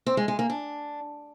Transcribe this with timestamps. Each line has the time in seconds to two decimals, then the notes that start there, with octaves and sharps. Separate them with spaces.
0.06 C4
0.17 G#3
0.28 G#3
0.39 A#3
0.50 D4